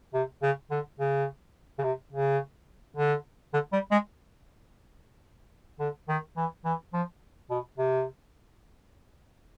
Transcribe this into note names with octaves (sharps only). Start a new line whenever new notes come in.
C3
C#3
D3
C#3
C#3
C3
C#3
D3
D3
G3
G#3
D3
D#3
E3
E3
F3
B2
C3